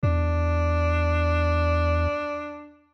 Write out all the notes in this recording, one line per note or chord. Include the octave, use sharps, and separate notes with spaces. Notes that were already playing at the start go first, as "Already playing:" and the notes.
E2 D4